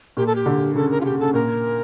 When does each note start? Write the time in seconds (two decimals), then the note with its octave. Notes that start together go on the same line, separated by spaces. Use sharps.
0.17 A#2 G4
0.27 A4
0.35 G4
0.46 D3
0.75 C#3 A4
0.90 A#4
1.01 F4
1.05 C#3 G4
1.19 C#3 A4
1.34 A#2 A#4